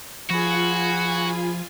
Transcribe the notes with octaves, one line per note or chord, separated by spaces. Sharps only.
F3 F4 F#4 G#4 G#5 B5